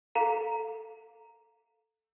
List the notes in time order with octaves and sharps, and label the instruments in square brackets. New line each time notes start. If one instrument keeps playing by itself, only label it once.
[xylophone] A4 F5 A#5